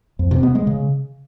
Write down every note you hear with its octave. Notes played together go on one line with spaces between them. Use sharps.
F2
C3
B3
G#3
C#3